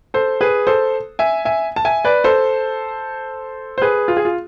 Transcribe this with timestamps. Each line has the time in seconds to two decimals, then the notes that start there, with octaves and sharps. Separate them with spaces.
0.14 A4 C5
0.41 G#4 B4
0.67 A4 C5
1.19 E5 G#5
1.45 E5 G#5
1.76 A5
1.85 E5 G#5
2.05 B4 D5
2.24 A4 C5
3.78 C5
3.81 G#4 B4
4.08 F4
4.17 G#4
4.25 F4